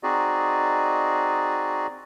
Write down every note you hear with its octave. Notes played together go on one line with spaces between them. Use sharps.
C4 D#4 F#4 G#4 D5 D#5